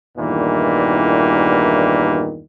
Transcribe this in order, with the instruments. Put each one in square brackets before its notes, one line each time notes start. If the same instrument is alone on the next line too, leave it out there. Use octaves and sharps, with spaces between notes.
[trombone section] E2 G2 A#2 D#3 E3